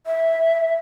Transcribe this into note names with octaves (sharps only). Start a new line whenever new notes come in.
E5